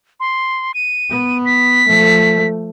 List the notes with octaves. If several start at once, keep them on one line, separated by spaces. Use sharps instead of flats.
C6
D#7
B3
B6
F3 A3